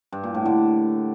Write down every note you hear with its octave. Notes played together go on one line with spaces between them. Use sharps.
G2
A#2
A2
D3